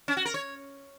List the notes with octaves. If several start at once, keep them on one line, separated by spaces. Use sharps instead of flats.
C#4
F#4
A#4
C#5